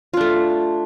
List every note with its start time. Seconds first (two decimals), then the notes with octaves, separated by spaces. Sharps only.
0.14 F4
0.17 D4
0.21 A3